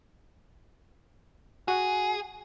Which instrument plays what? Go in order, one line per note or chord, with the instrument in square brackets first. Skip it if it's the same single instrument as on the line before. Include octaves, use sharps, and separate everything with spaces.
[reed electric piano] F#4 F#5 [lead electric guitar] G#4